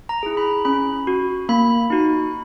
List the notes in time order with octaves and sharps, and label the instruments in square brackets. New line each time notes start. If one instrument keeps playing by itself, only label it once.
[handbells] A#5
E4 G#4
B5
C#4 B5
F#4
A#3 B5
D#4 F#4